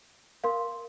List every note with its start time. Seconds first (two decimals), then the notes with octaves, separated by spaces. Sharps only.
0.44 A#4 F5 C6